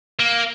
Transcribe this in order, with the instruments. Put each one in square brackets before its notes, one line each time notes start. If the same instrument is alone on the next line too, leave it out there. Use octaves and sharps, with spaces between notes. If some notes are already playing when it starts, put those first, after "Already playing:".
[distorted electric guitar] A#3